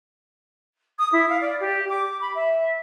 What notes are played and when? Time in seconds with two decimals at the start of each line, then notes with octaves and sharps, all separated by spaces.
0.98 D#6
1.12 E4
1.29 F5
1.41 D5
1.60 G4
1.88 D6
2.21 B5
2.34 E5